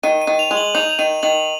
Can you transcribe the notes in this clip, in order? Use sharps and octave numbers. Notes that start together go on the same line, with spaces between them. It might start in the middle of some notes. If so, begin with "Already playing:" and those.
D#3 D#7
D#7
D#3
F7
G#3
F#7
D#4 F7
F7
D#3 D#7
D#3 F#7